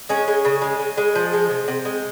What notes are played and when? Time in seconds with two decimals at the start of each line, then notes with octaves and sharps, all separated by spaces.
0.09 G#3 C#4
0.28 G#3
0.45 C#3
0.62 G#3
0.79 G#3
0.97 G#3
1.15 F3
1.33 G#3
1.50 C3
1.68 C3
1.85 G#3